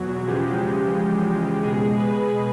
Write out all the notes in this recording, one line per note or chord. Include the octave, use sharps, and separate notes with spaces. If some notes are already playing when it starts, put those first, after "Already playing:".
Already playing: E2 B2 F#3 F#4
E2 C#3 F3 G#3 G4
B2 G#3 G#4
B4